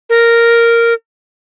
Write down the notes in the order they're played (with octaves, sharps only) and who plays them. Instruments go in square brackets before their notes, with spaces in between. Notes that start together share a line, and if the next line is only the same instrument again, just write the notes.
[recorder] A#4